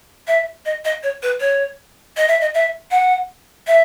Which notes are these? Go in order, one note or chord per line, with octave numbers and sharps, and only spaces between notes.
E5
D#5
D#5
C#5
B4
C#5
D#5
E5
D#5
E5
F#5
E5